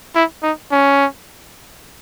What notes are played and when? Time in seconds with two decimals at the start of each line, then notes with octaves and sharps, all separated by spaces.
0.15 E4
0.43 D#4
0.72 C#4